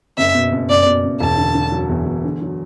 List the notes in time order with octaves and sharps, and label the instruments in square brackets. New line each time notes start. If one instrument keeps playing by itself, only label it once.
[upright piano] F#1 [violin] E5
[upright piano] B2
F#1
[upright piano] F#1 [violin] D5
[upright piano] B2
F#1
[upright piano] E1 [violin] A5
[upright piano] D3
D3
F#3
E2
E2
D3
F#3